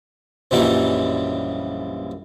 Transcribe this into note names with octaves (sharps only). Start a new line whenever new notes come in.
A#1 F#2 A#2 E3 G3 D#4